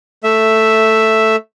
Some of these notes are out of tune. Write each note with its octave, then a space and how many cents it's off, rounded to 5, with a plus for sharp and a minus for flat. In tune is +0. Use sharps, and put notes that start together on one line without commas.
A3 +5 E5 +0